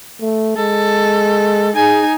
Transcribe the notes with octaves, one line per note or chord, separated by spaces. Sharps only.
A3
G#3 A4
D#4 G#4 G#5